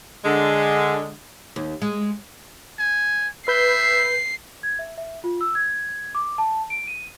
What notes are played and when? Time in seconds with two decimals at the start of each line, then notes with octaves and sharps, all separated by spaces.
0.25 D3 G#3
1.56 D#2
1.82 G#3
2.79 G#5
3.48 B4 E5 G6 C7
4.63 G#6
4.79 E5
4.98 E5
5.24 F4
5.41 E6
5.55 G#6
6.15 D6
6.38 A5
6.70 D7
6.87 D#7